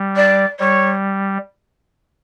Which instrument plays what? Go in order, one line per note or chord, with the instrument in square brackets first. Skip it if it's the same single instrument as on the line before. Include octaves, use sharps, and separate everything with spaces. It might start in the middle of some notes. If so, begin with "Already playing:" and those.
Already playing: [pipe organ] G3
[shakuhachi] D5
[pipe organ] G3 [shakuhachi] C#5